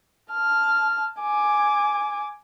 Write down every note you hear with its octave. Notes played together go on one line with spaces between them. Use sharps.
A5 F6
G#5 D6